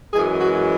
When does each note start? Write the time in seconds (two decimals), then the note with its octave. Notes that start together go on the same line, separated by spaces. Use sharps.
0.13 F#2 E3 G#3 G#4
0.40 F#4